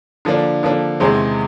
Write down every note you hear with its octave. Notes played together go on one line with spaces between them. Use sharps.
D3 F3 A#3 D4
D3 F3 A#3 D4
E2 C3 D#3 G#3 C4